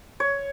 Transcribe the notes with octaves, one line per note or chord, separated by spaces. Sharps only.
C#5